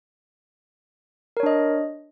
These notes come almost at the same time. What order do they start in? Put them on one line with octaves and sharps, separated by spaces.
A#4 C#5 D4 D#5